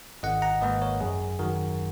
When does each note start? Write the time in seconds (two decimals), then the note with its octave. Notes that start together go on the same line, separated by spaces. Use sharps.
0.23 G#1 D#5 F#5
0.42 F#5 A#5
0.61 G#2 D#3 A#3 B4 D#5
0.82 A#4 C#5
1.01 F#2 G#4
1.39 D#3 F#3 F#4 A#4